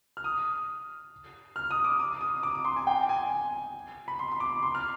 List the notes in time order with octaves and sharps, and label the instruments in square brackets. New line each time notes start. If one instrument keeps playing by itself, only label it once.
[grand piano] F6
D#6
F6
D#6
D6
D#6
D#6
D6
D6
C6
G#5
G5
G#5
B5
C6
C6
D6
C6
F6